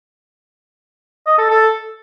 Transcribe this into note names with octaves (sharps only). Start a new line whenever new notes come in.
D#5
A4
A4